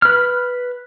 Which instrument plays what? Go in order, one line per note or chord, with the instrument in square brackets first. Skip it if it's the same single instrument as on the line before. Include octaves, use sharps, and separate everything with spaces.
[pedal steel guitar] B4 F6